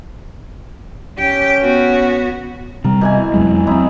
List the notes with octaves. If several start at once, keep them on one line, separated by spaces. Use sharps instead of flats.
C#4 G4 G5
B3 F#4
C3 G3 A#4
B2 E3 G#5
F2 F#3 G#3
F#3 A3 C4 D#4 E4